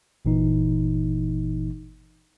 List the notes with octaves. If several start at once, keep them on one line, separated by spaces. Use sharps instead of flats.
G1 A#2 E3 D#4